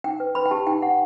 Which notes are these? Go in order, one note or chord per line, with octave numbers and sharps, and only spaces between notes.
D#4 G5
B4
B4 B5
G5
G4 A5
D#4 G5
G4 F#5